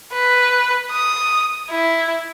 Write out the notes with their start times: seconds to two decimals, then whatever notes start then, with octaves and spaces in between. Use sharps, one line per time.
0.13 B4
0.91 D#6
1.70 E4